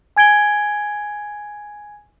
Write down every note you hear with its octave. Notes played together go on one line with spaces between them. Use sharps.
G#5 G#6 D7 G7